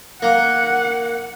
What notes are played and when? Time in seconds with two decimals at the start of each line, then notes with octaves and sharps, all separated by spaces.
0.22 A#3 F#5